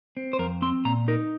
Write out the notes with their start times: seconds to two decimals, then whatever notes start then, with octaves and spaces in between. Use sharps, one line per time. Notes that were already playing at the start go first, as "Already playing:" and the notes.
0.17 C4
0.33 C5
0.39 F2 A#4
0.62 C4 C6
0.85 A#2 A#5
1.08 D#4 A#4